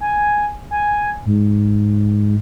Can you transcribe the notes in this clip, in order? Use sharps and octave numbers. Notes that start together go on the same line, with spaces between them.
G#5
G#5
G#2